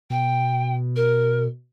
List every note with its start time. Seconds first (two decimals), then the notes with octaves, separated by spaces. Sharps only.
0.10 B2 G5
0.96 A#4